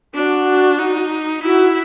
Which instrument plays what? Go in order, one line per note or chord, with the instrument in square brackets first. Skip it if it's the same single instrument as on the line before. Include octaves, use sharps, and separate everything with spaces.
[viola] D4 [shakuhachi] F#4
[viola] D#4
[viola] E4 [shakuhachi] F#4